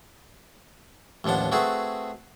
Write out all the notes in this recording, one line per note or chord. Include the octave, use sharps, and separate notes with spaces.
A1 D#2 F3 D4 F#5
A3 C4 F#4 G#4 B4